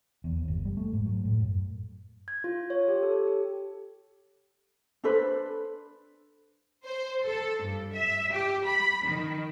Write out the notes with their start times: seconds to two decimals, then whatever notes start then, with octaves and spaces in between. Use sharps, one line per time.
0.24 E2
0.36 D#2
0.48 G1
0.65 G3
0.77 A3
0.93 G#2
1.06 F#3
1.25 A2
1.40 F#2
2.28 G#6
2.44 F4
2.70 C#5
2.88 G4
3.03 A4
3.27 G4
5.04 D4 A4 B4 C5
6.85 C5
7.24 A4
7.61 G2
7.94 E5
8.31 G4
8.65 B5
9.04 D#3